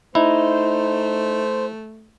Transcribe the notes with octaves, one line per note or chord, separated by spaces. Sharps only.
A3 D#4 E4 C5